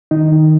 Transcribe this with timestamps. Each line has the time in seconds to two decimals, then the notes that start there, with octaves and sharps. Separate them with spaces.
0.11 D#3 D#4
0.32 D#3